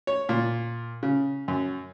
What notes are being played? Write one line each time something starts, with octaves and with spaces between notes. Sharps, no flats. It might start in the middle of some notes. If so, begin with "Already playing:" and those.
C#5
A#2
C#3
F#2